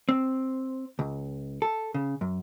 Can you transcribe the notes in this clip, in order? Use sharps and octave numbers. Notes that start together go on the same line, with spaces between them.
C4
C#2
A4
C#3
F#2